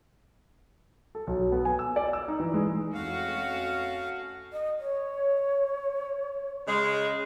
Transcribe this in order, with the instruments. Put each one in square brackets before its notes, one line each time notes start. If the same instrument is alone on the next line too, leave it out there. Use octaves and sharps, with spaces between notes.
[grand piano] A4
B1
B3
G#5
E6
D5
E6
D#4
E3
G#3
[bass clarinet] F2 [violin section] A3 C#4 F#4 [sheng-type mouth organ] F5
[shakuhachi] D#5
C#5
[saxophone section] C#3 G#3